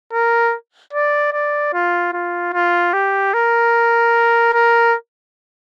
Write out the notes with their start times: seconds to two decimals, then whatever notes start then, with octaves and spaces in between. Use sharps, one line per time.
0.13 A#4
0.93 D5
1.33 D5
1.74 F4
2.13 F4
2.53 F4
2.93 G4
3.34 A#4
4.53 A#4